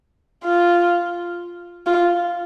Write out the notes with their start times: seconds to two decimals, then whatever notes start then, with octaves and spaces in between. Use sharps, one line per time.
0.44 F4
1.86 F4